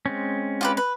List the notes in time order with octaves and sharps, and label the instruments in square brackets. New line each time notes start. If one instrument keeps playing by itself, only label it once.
[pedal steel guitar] G#3 C4 C#4
[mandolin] F4 G4 B4
B4